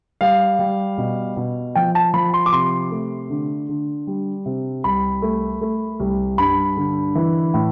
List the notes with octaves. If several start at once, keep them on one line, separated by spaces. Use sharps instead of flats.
G3 F5
G3
B2
B2
F3 G5
A5
F3 B5
C6
D6
C3 C6
A3
D3
D3
G3
C3
C2 B5
A3
A3
C2
G2 B5
D3
E3
A2